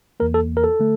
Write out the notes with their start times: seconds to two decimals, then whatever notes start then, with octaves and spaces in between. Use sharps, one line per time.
0.20 E2 E3 A#3 A#4
0.34 A4
0.57 A#4
0.64 A4
0.80 D3 A3